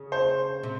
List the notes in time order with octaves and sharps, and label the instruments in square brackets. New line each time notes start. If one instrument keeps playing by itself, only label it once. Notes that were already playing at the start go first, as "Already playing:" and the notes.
Already playing: [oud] C#3
[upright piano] C5
[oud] C3